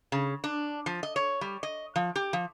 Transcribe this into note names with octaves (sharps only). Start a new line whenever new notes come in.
C#3
D4
F3
D#5
C#5
G3
D#5
F3
G4
F3